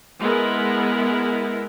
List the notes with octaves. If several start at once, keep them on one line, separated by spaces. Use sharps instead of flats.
G#3 B3 E4 A#4